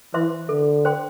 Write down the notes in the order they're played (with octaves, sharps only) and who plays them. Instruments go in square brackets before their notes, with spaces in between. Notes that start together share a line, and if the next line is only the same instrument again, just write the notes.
[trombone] E3 [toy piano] C5 E5 C6
[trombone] D3 [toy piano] A4
[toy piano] C5 G5 C6